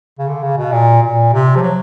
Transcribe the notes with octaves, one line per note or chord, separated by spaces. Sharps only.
C#3
D3
C#3
B2
A#2
A#2
C3
F3
F#3